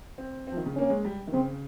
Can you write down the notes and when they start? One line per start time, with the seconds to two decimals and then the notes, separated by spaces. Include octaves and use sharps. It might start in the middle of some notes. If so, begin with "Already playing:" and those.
0.18 C4
0.47 C4
0.52 F3
0.57 D#3
0.66 C#3
0.76 A#3 C#4
0.90 G#3
1.05 G3
1.27 D#3
1.33 C#3 C4